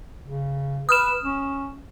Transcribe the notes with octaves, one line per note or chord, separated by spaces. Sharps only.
C#3
B4 D#6 F6 E7
C#4